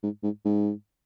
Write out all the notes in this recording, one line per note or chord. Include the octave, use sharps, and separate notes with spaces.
G#2
G#2
G#2